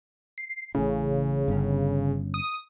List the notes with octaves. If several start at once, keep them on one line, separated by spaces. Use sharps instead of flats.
C7
A1 A2 C#3
G1 C#4
D#6